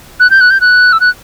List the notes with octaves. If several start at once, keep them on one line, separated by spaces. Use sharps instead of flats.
F#6
G6
F#6
G6
F#6
E6
F#6